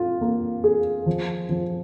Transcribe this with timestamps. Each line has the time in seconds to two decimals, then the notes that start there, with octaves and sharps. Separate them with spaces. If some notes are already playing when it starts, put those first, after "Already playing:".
Already playing: F4
0.21 A#3
0.64 G#4
1.06 F3
1.49 F3